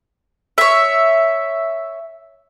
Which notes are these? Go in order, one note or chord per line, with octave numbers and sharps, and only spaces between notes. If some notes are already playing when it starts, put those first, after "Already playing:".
C#5 E5